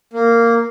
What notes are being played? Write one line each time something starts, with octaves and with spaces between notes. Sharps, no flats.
A#3